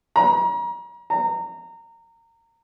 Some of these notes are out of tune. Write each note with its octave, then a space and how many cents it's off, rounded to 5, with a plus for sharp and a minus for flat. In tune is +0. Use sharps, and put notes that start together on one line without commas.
A#5 +35
A#5 -25